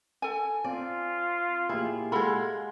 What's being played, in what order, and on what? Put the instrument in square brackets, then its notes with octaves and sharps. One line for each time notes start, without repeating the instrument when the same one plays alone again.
[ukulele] A4 G#5
[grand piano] C4 [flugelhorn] F4 [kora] D5
[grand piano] A#2 G4 G#4 [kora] E4
[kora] G#3 F4 [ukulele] A4 B5 [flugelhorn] F#5